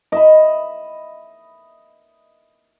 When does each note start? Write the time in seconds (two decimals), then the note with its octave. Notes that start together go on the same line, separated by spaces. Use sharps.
0.12 D#5 E5 B5